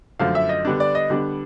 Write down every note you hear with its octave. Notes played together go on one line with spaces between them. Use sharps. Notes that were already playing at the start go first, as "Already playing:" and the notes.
F#2 D3 F3 A3 F5
E5
D#5
D3 G3 B3 D4
D5
D#5
D3 G3 B3 D4